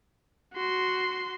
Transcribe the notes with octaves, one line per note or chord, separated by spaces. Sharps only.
F#4 C6